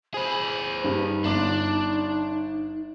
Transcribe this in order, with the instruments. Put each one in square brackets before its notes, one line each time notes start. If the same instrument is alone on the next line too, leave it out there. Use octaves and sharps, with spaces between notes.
[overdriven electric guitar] G#4 B4 [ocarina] C5
[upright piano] G2 [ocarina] D#4
[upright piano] G1 D6 [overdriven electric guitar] D4